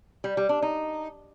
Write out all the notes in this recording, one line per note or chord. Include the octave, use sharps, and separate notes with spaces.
G3
G3
D4
D#4